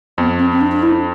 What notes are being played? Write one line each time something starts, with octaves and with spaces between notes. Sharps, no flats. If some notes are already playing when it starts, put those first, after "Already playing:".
F2 B3
C4
C4
D4
D4
E4